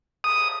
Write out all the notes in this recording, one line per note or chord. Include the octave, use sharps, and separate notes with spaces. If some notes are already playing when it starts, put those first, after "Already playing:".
D#6